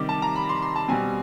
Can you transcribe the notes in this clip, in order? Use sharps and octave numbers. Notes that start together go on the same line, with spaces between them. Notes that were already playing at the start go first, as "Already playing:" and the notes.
Already playing: C3 D#3 G3 D6
A5
A#5
B5
C6
C6
A5
B2 G3 C4 G#5